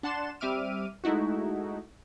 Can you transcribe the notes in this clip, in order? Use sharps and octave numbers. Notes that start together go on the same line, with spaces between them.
D4 F#5 A5 C6 E7
G3 C4 E5 D6 F6 D#7
G#3 A3 D#4 E4 F#4